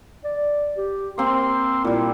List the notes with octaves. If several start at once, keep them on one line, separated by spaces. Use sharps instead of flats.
D5
G4
A#3 C4 C6
A#2 G3 E4